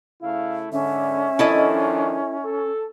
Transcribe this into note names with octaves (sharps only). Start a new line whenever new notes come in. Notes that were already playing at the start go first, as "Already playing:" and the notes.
C#3 A3 E4 F5
G#2 D3 C#4 E5
D#3 F3 D4 E4 A4 D#5
A4